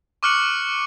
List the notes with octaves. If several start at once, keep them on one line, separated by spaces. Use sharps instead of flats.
C#6 D6 F6 F#6 C#7 F#7